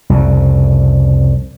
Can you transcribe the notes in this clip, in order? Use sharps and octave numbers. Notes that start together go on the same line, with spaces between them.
C2 F2 C#3